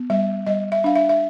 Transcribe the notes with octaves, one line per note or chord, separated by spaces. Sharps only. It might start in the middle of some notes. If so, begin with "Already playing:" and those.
Already playing: B3
G3 E5
G3 D#5
E5
D4 F5
E5
E5